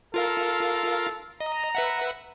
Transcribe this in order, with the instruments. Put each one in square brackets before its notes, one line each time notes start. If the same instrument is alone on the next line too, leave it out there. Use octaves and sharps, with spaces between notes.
[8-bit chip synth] F4 A#4 F5 [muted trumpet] A4
[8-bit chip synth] D#5 [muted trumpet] A#5
[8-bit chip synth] B4 E5 F#5